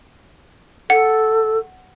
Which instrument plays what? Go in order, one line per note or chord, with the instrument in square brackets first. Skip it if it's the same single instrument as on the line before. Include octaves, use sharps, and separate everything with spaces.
[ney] A4 [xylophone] F#5